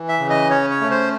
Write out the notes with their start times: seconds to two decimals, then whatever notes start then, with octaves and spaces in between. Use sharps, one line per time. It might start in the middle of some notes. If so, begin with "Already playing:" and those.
Already playing: E3
0.09 E5
0.19 C#3
0.30 D#5
0.50 C#4 C#5
0.70 C#5
0.81 A3
0.91 C5